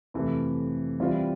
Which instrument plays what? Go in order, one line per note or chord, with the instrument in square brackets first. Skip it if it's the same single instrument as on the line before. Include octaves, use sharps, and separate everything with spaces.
[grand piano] F2 C3 E3 A3
E3 G3 C4 F4